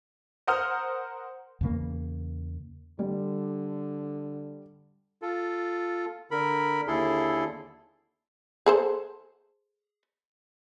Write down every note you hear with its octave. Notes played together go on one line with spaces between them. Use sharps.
A#4 C5 F#5 D#6 F6 G6
E2 C#3 A#3
D3 G3
F4 A4
D3 A#4 B5
D#2 D3 E4 G#4 A4 C6
G#4 A4 C5